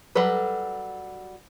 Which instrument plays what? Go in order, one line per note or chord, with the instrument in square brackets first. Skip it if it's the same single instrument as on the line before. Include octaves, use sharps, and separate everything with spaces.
[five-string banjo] F#3 G3 A4 B4